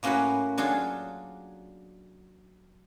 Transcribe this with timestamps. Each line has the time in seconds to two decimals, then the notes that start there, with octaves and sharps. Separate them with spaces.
0.03 A2 A#3 C#4 F#4 B4 F#5
0.58 F#3 D4 F4 G#4 A4